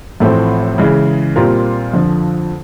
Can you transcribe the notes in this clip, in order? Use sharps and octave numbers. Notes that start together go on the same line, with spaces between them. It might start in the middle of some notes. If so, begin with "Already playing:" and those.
A1 A2 F3 A3 C4
C#3 E3 G#3
A#2 G3 C4 F4 A#4
F2 D3 F3